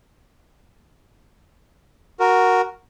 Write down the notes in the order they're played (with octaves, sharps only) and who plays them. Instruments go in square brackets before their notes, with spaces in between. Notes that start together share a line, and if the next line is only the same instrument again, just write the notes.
[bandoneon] F#4 A#4